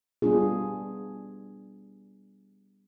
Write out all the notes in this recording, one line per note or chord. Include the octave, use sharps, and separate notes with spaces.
G3 B3 D4 F4 G#4